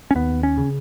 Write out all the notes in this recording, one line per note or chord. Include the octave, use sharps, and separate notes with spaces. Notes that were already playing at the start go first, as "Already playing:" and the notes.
C#4
D#2 B3
C#4
C#3